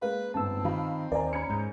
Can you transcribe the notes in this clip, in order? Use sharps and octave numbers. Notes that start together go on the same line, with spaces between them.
G#3 A#3 B4 F5
G1 G#2 C4 A5 E6
D#3 F4 F5 B5
D#2 A#4 C5 D5 G#5 A#5
C#4 B5 G#6 C#7
G#2 G6